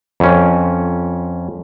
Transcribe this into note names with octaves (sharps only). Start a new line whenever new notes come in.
F2 C#4